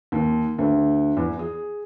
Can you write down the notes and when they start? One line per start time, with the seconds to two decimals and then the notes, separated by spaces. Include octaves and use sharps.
0.12 D#2
0.59 D2
1.17 E2
1.39 G#4